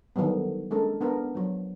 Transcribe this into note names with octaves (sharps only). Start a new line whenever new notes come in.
D3 D#3 F#3 G3 B3
G#3 A#3 C#4 D4 A4 A#4
B3 D4 A#4
F3 F#3